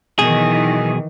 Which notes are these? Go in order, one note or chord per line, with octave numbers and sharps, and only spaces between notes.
B1 B2 D#3 E3 G#4